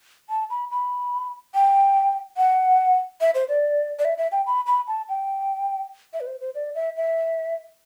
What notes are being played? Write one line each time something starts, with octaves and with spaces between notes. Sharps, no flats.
A5
B5
B5
G5
F#5
E5
C5
D5
D5
E5
E5
G5
B5
B5
A5
G5
E5
B4
C5
C5
D5
E5
E5